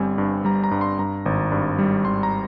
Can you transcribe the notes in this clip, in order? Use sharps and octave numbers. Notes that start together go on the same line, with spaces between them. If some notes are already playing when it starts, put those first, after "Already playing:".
Already playing: G1 G3 C4 G#5
G2
G3 A#5
A#5
G2
C6
G2 A#5
G#1
G2
G3
G#1 C6
A#5